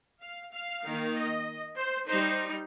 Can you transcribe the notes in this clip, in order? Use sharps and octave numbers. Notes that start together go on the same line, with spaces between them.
F5
F5
D#3 A#3 D#4
D#5
C5
G3 D#4 C5